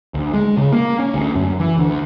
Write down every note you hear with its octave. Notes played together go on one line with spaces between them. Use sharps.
D2
G#3
C#3
A#3
C#4
D2
F#2
E3
D2